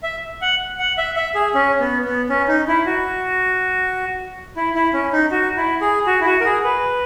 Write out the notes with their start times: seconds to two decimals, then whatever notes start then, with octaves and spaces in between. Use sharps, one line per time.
0.03 E5
0.42 F#5
0.79 F#5
0.98 E5
1.16 E5
1.35 G#4
1.54 C#4
1.80 B3
2.05 B3
2.29 C#4
2.48 D#4
2.68 E4
2.86 F#4
4.56 E4
4.75 E4
4.93 C#4
5.13 D#4
5.31 F#4
5.57 E4
5.81 G#4
6.07 F#4
6.21 E4
6.26 F#4
6.41 A#4
6.45 G#4
6.64 B4